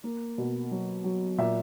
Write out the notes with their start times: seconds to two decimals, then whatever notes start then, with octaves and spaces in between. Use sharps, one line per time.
0.04 A#3
0.38 B2
0.71 F#3
1.04 F#3
1.38 A#2 E5